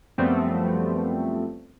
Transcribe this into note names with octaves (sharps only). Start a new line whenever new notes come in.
F#2 F3 G3 A3 B3 C4